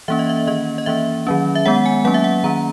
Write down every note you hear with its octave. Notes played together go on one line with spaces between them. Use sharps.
E3 A#3 C#4 E5
D#5
E5
D#3 A#3 C#4 D#5
D#5
E3 A#3 C#4 E5
D#3 F#3 C#4
E5
D#3 G#3 B3 F#5
G#5
F#3 A#3 C#4 F#5
E5
F#5
D#3 A#3 C#4 A#5